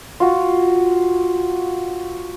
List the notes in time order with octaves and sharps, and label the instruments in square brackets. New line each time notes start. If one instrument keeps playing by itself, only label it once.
[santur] F4 F#4